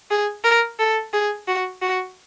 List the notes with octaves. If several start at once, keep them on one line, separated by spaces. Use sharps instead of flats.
G#4
A#4
A4
G#4
F#4
F#4